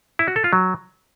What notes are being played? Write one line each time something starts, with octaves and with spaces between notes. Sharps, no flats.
E4
F#4
A4
F4
F#3